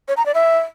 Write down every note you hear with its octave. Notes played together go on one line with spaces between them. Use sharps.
C#5
A#5
D5
E5